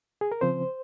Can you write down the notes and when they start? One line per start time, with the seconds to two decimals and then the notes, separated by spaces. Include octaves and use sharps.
0.21 G#4
0.32 A#4
0.41 C#3 F3 C4 C5